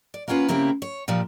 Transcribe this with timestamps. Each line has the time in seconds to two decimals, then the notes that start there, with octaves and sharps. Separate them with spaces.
0.14 D5
0.28 A#3 B3 C#4 F4 B4
0.49 C#3 A#3 C4 E4 G4
0.82 C#5
1.08 A#2 F3 G3